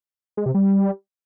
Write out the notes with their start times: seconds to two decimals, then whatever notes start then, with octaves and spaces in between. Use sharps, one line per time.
0.37 G#3
0.46 C3
0.54 G3